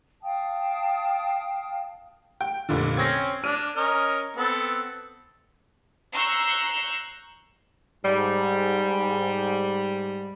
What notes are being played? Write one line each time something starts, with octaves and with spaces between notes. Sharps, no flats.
F5 G5 A5 D#6
G5
F1 A#2 D3
C4 C#4 G#6 A#6
D4 F6 D#7
C#4 A#4 D#5
B3 C4 A4
A#5 C#6 E6 F#6 G6 C7
G#2 G3